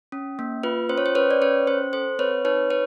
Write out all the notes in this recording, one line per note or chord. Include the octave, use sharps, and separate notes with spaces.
C#4
A#3
F4 B4
C#4 C5
C#5
C5
C#4 B4 C#5
D5
C#4 B4 C#5
C#4 C5
A4 C5
C4 B4 C#5
D#4 B4 C#5
B4 C#5